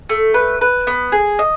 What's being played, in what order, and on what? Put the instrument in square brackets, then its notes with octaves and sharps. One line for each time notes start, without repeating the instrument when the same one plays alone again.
[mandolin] A3
B4
B4
B3
G#4
D#5